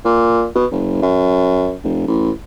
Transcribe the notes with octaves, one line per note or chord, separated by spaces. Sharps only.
A#2
B2
F#1
F#2
F1
A1